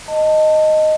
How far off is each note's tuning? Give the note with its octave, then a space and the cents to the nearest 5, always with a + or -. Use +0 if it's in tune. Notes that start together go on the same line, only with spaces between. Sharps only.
D#5 +0 A5 +15